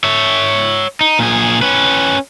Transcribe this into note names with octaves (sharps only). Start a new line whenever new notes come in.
C#5 E5
D#4
A#2 G#4
C#4 B4